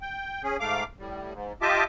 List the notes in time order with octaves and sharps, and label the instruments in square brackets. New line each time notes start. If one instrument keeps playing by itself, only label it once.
[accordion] G5
C#4 G#4
G#2 A3 F5 D6
A2 G3
G#2
F4 G4 D#5 E5 A5 D6